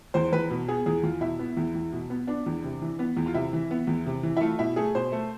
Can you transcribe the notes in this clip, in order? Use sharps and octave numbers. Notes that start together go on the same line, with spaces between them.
E2 C5
E2 B4
B2
B3 G#4
E2 G#4
E2 F4
B2 E4
B3
E2
E2
B2
B3
B3 D4
E2
C3
E3
B3
E2
F4
C3 E4
E3
B3
E2
C3
E3
E4
A3 F4
B2 E4
A3 G#4
B2 C5
A3